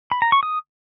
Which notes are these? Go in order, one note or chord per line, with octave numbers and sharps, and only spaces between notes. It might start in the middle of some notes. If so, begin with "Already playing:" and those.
B5
A#5
C#6
D#6